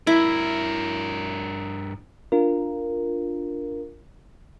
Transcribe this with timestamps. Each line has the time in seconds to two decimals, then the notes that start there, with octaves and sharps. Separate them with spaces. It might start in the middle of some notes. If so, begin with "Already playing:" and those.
0.07 G2 E4 A#4
2.32 D4 F4 A#4